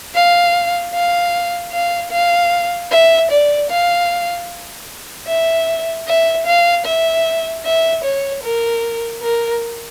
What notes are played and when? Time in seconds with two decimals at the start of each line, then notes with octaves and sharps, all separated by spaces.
0.15 F5
0.94 F5
1.72 F5
2.12 F5
2.92 E5
3.31 D5
3.70 F5
5.27 E5
6.08 E5
6.46 F5
6.86 E5
7.65 E5
8.04 C#5
8.43 A#4
9.22 A#4